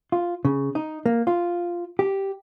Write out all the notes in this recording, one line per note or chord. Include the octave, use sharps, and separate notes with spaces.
F4
C#3
D#4
A#3
F4
G4